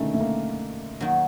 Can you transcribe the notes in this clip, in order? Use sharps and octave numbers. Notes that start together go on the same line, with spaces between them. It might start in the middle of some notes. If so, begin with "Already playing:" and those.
Already playing: B2 D3 D#3 G#3 A3 C#4
A3
A#3
D#3 F#3 A#3